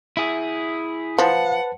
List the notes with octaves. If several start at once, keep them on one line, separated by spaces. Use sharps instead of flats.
E4 G#4
F3 B4 F#5 A5